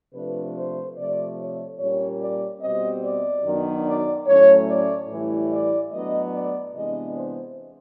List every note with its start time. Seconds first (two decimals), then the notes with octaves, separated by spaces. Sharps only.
0.14 C3 F3 A3 D4 B4
0.56 C5
0.97 C3 F3 A3 D5
1.39 C#5
1.80 A#2 G3 A#3 C#4 C#5
2.21 D5
2.61 B2 G3 C4 D#5
3.03 D5
3.44 F#2 D#3 F#3 B3 D4
3.86 D5
4.27 A2 F#3 A3 C#4 C#5
4.69 D5
5.09 A2 E3 G3
5.51 D5
5.92 A2 F#3 B3 D4 D#5
6.32 D5
6.74 C3 E3 G#3 B3 D4 D#5
7.15 C5